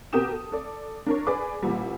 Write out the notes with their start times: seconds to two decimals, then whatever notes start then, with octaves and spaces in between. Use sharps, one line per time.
0.13 B2 G4 A#4 G5 D#6 E7
0.32 A4
0.52 A4 D5
1.07 D4 A#4 C#5
1.27 G#4 B4 D5 D6
1.62 A1 A#2 G3